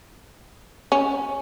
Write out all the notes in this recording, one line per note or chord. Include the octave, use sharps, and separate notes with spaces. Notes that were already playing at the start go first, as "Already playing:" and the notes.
C#4